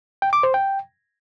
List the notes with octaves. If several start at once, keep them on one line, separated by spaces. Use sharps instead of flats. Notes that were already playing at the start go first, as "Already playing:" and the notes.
G5
D6
C5
G5